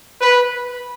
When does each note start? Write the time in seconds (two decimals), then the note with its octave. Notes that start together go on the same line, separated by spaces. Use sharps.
0.21 B4